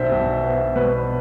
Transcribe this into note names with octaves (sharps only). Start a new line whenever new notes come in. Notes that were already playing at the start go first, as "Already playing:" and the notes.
Already playing: B1 B2 B3 D4 C5 E5
B1
B3
B2 B4